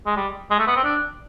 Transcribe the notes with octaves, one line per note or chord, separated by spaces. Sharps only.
G#3
G3
G#3
A3
B3
C4
D4